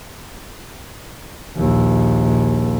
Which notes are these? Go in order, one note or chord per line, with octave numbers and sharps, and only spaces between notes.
A#1 D#2